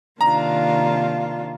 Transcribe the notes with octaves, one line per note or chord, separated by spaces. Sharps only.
C3 D#3 A#3 D4 F4 A#5